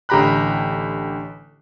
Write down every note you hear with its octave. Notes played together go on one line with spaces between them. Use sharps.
A1 D3 G4 A#5 B5 F#6